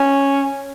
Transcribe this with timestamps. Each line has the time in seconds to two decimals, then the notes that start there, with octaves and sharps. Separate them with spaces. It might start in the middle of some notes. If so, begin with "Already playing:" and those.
Already playing: C#4